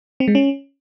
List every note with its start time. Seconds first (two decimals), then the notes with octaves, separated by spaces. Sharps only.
0.20 C4
0.28 G#3
0.35 C#4